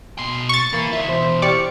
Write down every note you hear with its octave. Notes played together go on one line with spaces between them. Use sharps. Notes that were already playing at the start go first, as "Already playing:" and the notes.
B2 C6
C#6 A6
A#3 E4 B4
F4 C#5 E5
B2 E3 C5
G4 D5 C#6 F6